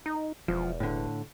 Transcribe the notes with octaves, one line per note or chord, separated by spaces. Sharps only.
D#4
E1 F3
A2 D3